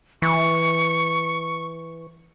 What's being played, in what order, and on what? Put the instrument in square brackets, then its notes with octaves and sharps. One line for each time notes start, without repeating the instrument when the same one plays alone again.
[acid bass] E3 [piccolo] C#6